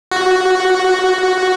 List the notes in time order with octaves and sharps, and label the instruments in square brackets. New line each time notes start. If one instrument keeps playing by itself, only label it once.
[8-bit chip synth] F#4